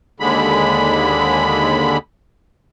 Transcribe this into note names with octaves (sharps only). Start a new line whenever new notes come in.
D#2 D3 G#3 B5